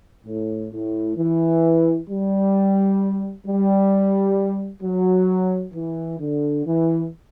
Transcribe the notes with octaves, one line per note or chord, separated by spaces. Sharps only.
A2
A2
E3
G3
G3
F#3
E3
D3
E3